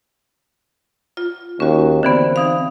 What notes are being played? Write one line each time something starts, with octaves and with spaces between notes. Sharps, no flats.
F4
D#2 C#4 F#4
D3 E3 B3 C4
E3 D#4 F5